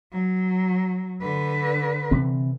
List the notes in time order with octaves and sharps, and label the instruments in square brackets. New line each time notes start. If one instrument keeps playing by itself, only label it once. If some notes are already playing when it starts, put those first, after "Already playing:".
[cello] F#3
D3 B4
[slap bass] C3 E3 C4